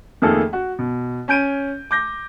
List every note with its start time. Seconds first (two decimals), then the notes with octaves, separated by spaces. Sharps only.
0.22 F2 D#3 A3 A#3 G#4 A4
0.53 F#4
0.79 B2
1.28 C#4 G#5 G6 D7 D#7
1.91 D6 G6 A#6